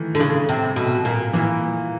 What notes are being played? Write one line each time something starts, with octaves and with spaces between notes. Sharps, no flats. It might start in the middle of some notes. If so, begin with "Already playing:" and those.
Already playing: D#3 E3 A3
D3
C#3
C3
B2
A#2
A#2 E3